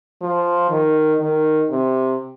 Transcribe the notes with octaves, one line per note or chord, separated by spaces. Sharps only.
F3
D#3
D#3
C3